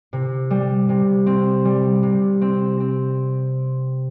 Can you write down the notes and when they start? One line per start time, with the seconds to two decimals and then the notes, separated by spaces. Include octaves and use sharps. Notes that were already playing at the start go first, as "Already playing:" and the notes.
0.13 C3
0.51 G3
0.89 C3
1.26 C4
1.65 G3
2.03 C3
2.41 C4
2.80 C4